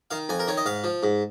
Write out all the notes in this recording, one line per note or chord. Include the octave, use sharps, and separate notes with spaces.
D#3 F5
F2 G#5
A#4
D#3 C#5
D#5
G#2 F5
F3
G#2